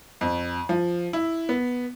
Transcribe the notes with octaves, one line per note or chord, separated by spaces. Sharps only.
F2
F3
E4
B3